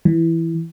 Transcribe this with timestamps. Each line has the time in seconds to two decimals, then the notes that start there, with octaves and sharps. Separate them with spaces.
0.05 E3